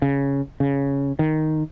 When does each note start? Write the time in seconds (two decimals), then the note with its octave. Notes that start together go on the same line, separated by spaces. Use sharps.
0.02 C#3
0.60 C#3
1.19 D#3